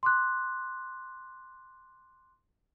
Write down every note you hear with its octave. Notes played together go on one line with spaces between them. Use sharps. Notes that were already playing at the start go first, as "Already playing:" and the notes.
C6 D6 F#6